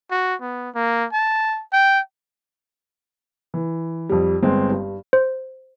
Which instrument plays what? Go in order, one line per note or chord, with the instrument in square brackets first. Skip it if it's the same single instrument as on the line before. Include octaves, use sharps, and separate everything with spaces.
[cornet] F#4
B3
A#3
A5
G5
[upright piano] E3
F2 G3
G1 G#3 C4
G2
[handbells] C5